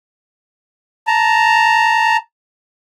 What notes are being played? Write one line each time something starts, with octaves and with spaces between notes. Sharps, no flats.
A5 A#5